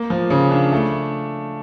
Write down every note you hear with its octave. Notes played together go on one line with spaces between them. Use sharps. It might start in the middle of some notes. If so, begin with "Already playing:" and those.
Already playing: A#3
F3
C#3
D4
A3